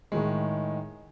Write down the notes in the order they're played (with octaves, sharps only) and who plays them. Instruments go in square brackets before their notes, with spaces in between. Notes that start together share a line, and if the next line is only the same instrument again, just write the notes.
[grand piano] A2 D#3 G#3